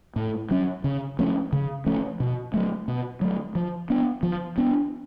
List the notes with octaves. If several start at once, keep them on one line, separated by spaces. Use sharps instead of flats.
A2
F#3 C#4
C#3
F3 A3 C#4
C#3
F3 A3 C#4
B2
F#3 A3
B2
F#3 A3
F3
B3 D4
F3
B3 D4